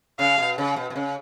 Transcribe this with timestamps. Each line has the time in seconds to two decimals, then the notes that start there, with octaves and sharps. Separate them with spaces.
0.19 C#3 F5
0.38 B2
0.58 C#3
0.76 B2
0.90 B2
0.96 C#3